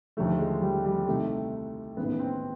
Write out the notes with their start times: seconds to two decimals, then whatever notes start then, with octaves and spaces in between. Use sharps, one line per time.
0.17 D#2 D3 F3 A3
0.39 G#3
0.62 G3
0.85 G3
1.07 C2 C3 D#3 A3
1.97 A1 G#2 D#3 B3
2.19 C4